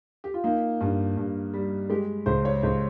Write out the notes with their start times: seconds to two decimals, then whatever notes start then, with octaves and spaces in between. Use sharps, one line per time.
0.24 G4
0.34 F4
0.44 A#3 D#4
0.81 G2
1.17 G2
1.54 G3
1.90 G#3 G4
2.26 C#2 C5
2.45 C#5
2.63 C#2 C5